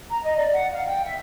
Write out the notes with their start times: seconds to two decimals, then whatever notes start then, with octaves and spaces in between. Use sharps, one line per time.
0.11 A#5
0.24 D#5
0.36 D5
0.53 F#5
0.72 F5
0.88 G5
1.05 E5